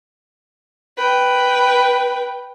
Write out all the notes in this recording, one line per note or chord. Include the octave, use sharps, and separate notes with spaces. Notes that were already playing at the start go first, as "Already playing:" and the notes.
B4 G5